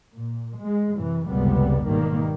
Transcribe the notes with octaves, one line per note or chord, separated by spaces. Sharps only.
A#2
G#3
F#2 C3 E3
G1 C#2 F#2 C3 G3 B3
G#2 B2 D#3 G3 A#3